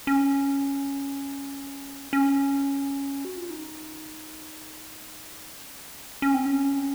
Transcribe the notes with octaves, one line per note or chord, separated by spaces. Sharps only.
C#4
C#4
F#4
F4
D#4
C#4
C#4
C4
C#4